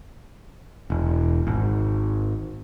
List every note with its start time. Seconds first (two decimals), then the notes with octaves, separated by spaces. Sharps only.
0.90 E1
1.47 G#1